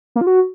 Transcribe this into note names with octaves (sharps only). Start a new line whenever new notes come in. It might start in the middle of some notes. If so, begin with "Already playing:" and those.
A#3
F4
F#4